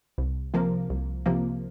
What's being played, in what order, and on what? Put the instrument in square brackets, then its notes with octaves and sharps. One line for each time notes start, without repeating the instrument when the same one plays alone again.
[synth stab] C2
C3 F3 A#3
C2
C3 F3 A#3